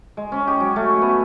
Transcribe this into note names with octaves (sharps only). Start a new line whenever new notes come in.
G#3
C#4
G4
F#3
A3
B3